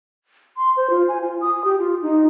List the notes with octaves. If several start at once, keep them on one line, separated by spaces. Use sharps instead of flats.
C6
C5
F4
G#5
F4
D#6
G4
F4
D#4